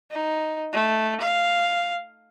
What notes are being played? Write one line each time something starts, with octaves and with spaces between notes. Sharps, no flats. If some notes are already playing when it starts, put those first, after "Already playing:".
D#4
A3
F5